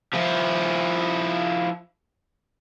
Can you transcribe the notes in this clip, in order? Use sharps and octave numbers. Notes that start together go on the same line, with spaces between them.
F3 E4